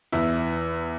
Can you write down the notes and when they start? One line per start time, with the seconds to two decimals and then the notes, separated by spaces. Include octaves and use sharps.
0.12 E2 E4